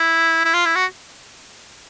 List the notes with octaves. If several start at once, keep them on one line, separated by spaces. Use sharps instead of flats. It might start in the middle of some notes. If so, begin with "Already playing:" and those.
Already playing: E4
E4
F4
E4
F#4